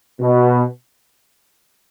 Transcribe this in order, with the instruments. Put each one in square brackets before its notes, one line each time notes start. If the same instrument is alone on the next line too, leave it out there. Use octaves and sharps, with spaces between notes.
[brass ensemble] B2